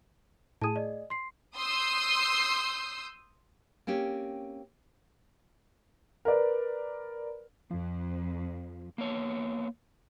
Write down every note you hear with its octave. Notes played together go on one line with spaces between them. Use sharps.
A2 G#4 A5 D#7
D5 D#5
C6 C7
C6 D#6 E6 G6 C7
A#3 C4 C#4 G4
A#4 B4 D5
F2 F3
A#3 B3 C#5